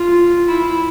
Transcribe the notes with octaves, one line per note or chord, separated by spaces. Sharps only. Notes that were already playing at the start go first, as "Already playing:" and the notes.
Already playing: F4
E4